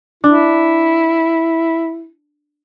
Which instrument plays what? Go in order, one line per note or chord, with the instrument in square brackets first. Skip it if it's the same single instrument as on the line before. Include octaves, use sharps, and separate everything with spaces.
[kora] D4 [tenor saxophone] E4